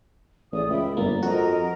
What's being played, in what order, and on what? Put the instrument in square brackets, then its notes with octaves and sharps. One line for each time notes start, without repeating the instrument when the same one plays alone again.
[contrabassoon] A1 [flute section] G#4 D5 D#6
[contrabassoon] C#2 [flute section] E5 G5 B5
[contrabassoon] G1 [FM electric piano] G2 A#3 [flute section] D5 A#5
[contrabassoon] F2 [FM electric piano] F#4 [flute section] A#4 D#5 A#5